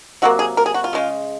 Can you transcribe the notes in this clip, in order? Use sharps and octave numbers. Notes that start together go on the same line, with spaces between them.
C3 F#3 A#3 F#4
G#4
A#4
G#4
F#4
F4
C#3 G#3